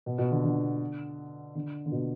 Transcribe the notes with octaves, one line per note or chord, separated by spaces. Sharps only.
B2
B2
D3
D3
D3
D3
B2